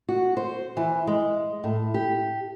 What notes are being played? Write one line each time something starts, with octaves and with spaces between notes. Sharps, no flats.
F#4
C5
E3
G#3
A2
G4